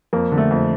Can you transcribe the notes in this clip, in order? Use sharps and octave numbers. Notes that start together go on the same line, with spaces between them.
F2 A#3
D3
A3
F2